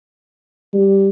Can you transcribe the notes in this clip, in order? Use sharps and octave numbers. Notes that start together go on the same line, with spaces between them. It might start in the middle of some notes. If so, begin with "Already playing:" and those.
G3